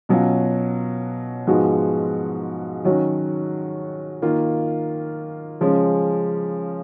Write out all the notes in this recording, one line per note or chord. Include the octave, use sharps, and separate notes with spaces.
B2 F#3 C#4 F4
G#2 F3 G#3 B3 F#4
D#3 F#3 C#4 F#4
D#3 A#3 F4
C#3 F3 G#3 C#4